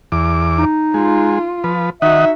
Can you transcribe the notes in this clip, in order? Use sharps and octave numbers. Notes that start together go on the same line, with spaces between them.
E2 D6
D#4
G#3 F4
F3 B4
D#3 D#4 F#4 D#5 E5 F#5